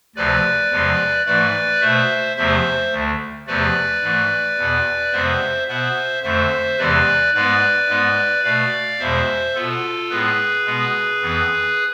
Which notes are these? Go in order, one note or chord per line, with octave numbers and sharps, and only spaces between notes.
D2 C3 F3 B4 D5
E2 C3 F3 G#3
G#2 E3 A3 B4 D5
B2 A3 C5 E5
E2 C3 F3 A3 C5 E5
D2 D3 A3
E2 C3 F3 A3 B4 D5
G#2 E3 A3
E2 B2 B3
F2 C3 G#3 B3 C5 E5
B2 B3 C5 E5
F2 D3 A3 C5 E5
E2 C3 E3 G#3 B4 D5
G#2 G#3 B3 B4 D5
G#2 G#3 B3
B2 A3 D5 F5
E2 B2 G#3 C5 E5
B2 B3 F4 A4
A2 G#3 B3 G#4 B4
B2 G#3 B3
F2 E3 B3